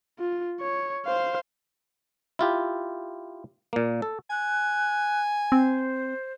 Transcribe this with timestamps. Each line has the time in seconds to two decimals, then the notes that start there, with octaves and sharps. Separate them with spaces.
0.19 F4
0.60 C#5
1.06 C5 F5
2.39 E4 F4 G4
3.73 A#2 A#3
4.02 A4
4.30 G#5 F#6
5.52 C4 C5